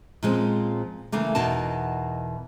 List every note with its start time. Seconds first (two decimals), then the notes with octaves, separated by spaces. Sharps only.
0.23 A#2 F3 G#3 C4 C#4
1.12 C#3 E3 A3 A#3
1.35 E2 B2 D#4 A#4 A5